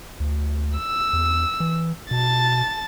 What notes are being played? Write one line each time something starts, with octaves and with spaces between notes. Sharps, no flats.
D2
E6
E2
E3
B2 A5 A6